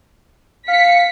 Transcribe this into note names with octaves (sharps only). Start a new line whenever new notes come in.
F5 B6 C#7